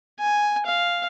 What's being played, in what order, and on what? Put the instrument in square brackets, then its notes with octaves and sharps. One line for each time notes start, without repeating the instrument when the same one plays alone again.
[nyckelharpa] G#5
F5